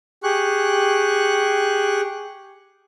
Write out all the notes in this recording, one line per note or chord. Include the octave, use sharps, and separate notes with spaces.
G4 G#4 C#6 F#6